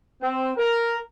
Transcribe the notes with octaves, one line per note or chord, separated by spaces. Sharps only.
C4
A#4